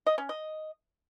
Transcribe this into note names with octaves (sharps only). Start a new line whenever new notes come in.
D#5
C#4
D#5